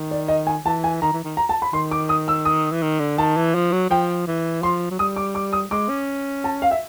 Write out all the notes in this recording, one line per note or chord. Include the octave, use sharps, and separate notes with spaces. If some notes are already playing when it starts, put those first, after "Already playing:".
Already playing: D#3
D5
D#5
G#5
E3 A5
G#5
D#3 A#5
E3
D#3
A#5
A5
B5
D#3 C6
D6
D#6
E6
D#6
E3
D#3
D3
D#3 A5
E3
F3
F#3
F3 G5
E3
F3 C6
F#3
G3 D#6
D6
D6
D#6
G#3 D6
C#4
A5
F5
E5